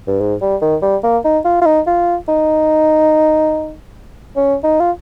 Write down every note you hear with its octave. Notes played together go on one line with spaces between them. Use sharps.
G2
G#2
G3
D#3
G3
A#3
D#4
F4
F4
D#4
F4
D#4
C#4
D#4
F4